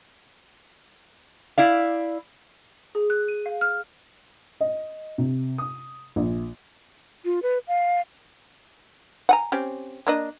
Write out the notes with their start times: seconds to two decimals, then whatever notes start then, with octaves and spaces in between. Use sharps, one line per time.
1.58 E4 D5 F5
2.95 G#4
3.10 F#6
3.28 D#7
3.46 F5
3.61 F6
4.61 D#5
5.18 C3
5.58 D#6
6.16 A#1
7.25 F4
7.43 B4
7.68 F5
9.29 F#5 G#5 A#5
9.52 C4 C#4 G4
10.07 A#3 D4 D#5